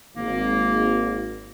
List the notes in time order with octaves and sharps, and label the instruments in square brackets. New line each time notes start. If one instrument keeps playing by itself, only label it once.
[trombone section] G#1 [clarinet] A#3